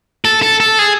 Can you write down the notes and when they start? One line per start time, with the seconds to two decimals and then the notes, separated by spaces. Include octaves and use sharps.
0.25 A4
0.42 A4
0.60 A4
0.79 G#4